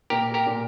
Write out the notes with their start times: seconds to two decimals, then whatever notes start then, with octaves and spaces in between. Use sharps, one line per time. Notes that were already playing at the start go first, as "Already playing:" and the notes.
0.10 A#2 G4 A#4
0.34 G4 A#4
0.46 A#2